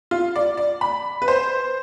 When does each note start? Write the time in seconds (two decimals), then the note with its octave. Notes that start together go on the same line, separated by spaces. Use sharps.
0.11 F4
0.36 D5
0.57 D5
0.81 B5
1.22 B4
1.28 C5